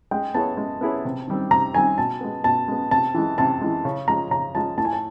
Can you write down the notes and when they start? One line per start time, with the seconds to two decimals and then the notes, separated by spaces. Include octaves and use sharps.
0.11 G#3 G5
0.34 B3 E4 G#4 C#5 A5
0.57 G#3
0.81 B3 E4 G#4 C#5
1.05 C3
1.27 D#3 G3 C4
1.51 C3 A#5
1.74 D#3 G3 C4 G#5
1.97 B2 A5
2.21 G#3 B3
2.44 B2 A5
2.68 G#3 B3
2.91 C3 A5
3.14 E3 G#3
3.38 C3 A5
3.61 E3 G#3
3.85 C#3
4.08 F3 G#3 A#5
4.31 C#3 A#5
4.55 F3 G#3 A5
4.77 A2 A5
4.85 G#5
4.93 A5